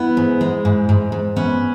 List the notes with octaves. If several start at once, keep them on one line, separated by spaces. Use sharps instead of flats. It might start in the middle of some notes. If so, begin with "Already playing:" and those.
Already playing: B3 E4
G#2
G#3
G#2
G#2
G#2
B3 C#4